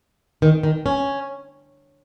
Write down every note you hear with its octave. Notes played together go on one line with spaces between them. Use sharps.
D#3
D#3
C#4